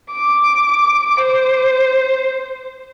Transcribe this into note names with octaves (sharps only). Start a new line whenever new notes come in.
D6
C5